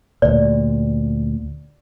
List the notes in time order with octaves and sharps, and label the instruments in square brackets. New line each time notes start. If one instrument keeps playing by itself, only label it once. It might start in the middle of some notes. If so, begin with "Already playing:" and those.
[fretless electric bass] D2 A#2 [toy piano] D5